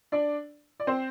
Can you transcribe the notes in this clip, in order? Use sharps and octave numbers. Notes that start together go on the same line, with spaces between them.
D4 D5
D5
C4 C5